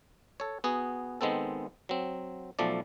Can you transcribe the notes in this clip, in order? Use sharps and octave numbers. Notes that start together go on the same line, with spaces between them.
A4 C#5
B3 F#4 G#4
D#3 G#3 B3 C4 A4
F#3 C4
B1 F3 A3 D5